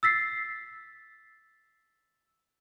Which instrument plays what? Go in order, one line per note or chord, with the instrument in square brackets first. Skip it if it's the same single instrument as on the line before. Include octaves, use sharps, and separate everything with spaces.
[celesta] E6 A6 B6 C7